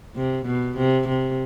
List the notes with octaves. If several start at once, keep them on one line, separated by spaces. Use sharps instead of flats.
C3
B2
C3
C3